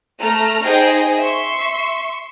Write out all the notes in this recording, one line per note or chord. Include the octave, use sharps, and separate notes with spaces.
A3 A#5 F6
D#4 G#4 C5 D#5 G5
E5 C6 C#6